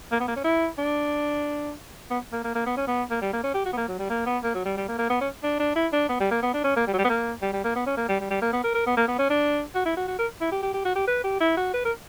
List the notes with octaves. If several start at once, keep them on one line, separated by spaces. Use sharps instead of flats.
A#3
B3
A#3
C#4
E4
D4
B3
A#3
A#3
A#3
B3
C#4
B3
A#3
G3
A#3
C#4
G4
F#4
B3
A#3
F#3
G3
A#3
B3
A#3
F#3
G3
G3
A#3
A#3
B3
C#4
D4
D4
E4
D4
B3
G3
A#3
B3
D4
C#4
A#3
G3
F#3
G3
B3
A#3
G3
G3
A#3
B3
C#4
A#3
G3
G3
G3
A#3
B3
A#4
A#4
B3
A#3
B3
C#4
D4
F#4
E4
F#4
F#4
A#4
E4
G4
G4
G4
F#4
G4
B4
G4
E4
F#4
B4
A#4